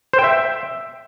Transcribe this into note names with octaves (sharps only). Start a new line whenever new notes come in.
C5
G5
E5